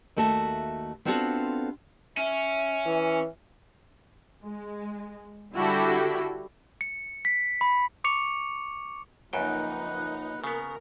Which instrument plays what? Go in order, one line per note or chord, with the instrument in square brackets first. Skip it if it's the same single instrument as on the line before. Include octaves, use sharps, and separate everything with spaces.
[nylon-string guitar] D#2 A3 F#4 E5 A5
B3 C4 D4 F4 F#4 A4
[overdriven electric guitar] C#4 [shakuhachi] E5
[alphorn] E3
[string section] G#3
D3 G3 E4 F#4 G4 A4
[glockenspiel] C#7
B6
B5
C#6 D6 C#7 F7
[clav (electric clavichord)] C#2 F#2 G5 [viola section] F3 A#3 D#4 [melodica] B4 F#5
[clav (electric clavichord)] C#3 B3 [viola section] A#4